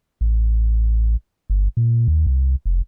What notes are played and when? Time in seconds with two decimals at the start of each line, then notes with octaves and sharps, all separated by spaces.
0.21 A1
1.50 G1
1.77 A#2
2.08 D#2
2.27 C2
2.65 F1